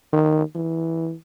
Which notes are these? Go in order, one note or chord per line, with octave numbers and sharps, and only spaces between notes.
D#3
E3